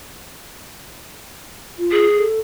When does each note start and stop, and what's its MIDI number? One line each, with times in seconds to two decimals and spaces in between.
1.79 2.06 65
1.92 2.23 68
2.17 2.40 69